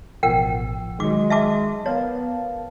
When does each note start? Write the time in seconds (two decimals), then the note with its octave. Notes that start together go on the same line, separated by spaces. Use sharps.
0.23 A1 B2 F3 A#4 F#5 G5
1.00 D#3 F#3 G#3 D6
1.30 E5 A5 D6
1.86 B3 A#4 C#5 F5 A5